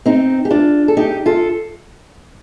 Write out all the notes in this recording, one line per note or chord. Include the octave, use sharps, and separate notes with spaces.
C4 D#4
G4
D4 F4
A4
D#4 G4
F4 A4